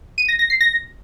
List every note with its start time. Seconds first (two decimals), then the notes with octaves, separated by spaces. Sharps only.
0.18 D#7
0.28 A#6
0.39 A#6
0.50 C7
0.61 A#6